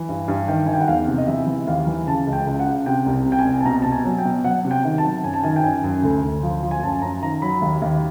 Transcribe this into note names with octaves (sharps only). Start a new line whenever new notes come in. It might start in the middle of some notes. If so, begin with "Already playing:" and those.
Already playing: E3
G2
G2
D#3 G5
D#3 G#5
G5
F#5
E2 F5
C3
D#5
E3 E5
E3
D#2 F5
E3
C#3 A5
C#2
G5
C#2
F#5
C#3
C3 G5
C2
C3
G5
G#5
C2
A5
B2 A#5
B2 A5
G#5
F#3
G5
B2
F#3 F#5
C3
G5
D#3
A5
F#3
F#2 G#5
A5
D#3 G#5
G5
F#2 G#5
F#2
D2
D2
F3
F3
G#5
F#2 A5
F#2 A#5
D#3 A#5
F#3 B5
D#2
D#2